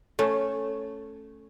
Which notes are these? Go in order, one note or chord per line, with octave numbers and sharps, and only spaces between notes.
A3 C#4